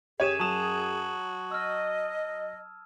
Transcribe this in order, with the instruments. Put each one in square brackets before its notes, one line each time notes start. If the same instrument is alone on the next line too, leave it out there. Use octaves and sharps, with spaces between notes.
[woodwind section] F#2 G#4 [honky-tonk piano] G4 C#5 [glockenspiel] G#6 D#7 E7
[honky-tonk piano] F#3 E7 [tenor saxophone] F#4 [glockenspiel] A5 D#6 F7
[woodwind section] D#5 [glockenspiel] E6 F6